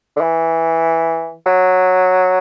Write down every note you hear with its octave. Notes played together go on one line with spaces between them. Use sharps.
D3
E3
F#3